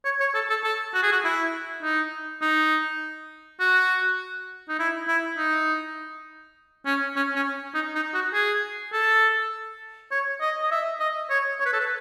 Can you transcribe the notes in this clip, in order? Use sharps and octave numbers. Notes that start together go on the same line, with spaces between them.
C#5
C#5
A4
A4
A4
F#4
G#4
F#4
E4
D#4
D#4
F#4
D#4
E4
E4
D#4
C#4
C#4
C#4
D#4
D#4
F#4
G#4
A4
C#5
D#5
D#5
E5
D#5
C#5
C#5
B4
A4
B4